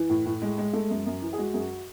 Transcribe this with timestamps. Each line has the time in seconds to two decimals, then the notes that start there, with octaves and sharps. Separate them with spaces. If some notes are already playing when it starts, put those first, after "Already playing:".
Already playing: E3
0.10 A2
0.26 A2
0.42 G#3
0.58 G#3
0.73 A3
0.90 F#2
1.06 F#2
1.22 E3
1.33 G#4
1.38 G#3 F#4
1.54 F#2 G#4
1.59 F#4